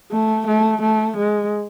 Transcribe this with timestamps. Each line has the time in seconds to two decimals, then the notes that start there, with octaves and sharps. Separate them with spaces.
0.12 A3
0.47 A3
0.82 A3
1.17 G#3